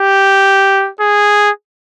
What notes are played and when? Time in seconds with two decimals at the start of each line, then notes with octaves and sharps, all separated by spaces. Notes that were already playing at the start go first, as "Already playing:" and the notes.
Already playing: G4
1.00 G#4